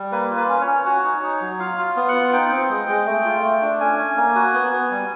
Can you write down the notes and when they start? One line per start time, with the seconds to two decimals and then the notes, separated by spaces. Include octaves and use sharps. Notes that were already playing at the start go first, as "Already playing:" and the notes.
Already playing: G3
0.12 A#3 B4
0.31 F4
0.37 B4
0.49 C#4
0.61 C#5
0.67 C#4
0.85 F#4 C#5
1.04 D#4
1.23 D#4
1.41 F#3
1.59 F4 F5
1.77 F4
1.96 B3
2.08 F#5
2.15 F4
2.33 D#4 G5
2.51 C4
2.70 G#3
2.88 G#3
3.06 A3
3.25 F4
3.44 A3
3.62 D4
3.80 C#4 G#5
3.99 C#4
4.17 A#3
4.35 F#4
4.54 B3
4.73 B3
4.91 G3